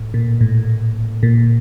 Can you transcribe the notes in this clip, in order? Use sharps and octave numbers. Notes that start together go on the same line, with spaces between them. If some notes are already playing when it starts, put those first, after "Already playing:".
Already playing: A2
A#2
A2
A#2